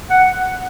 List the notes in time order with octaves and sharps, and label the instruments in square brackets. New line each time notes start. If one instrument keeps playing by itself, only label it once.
[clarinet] F#5